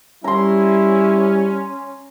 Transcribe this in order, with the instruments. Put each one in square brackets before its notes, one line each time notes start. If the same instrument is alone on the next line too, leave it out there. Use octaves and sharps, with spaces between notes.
[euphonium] G3 [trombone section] C#4 [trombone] E4 [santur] A#5 C6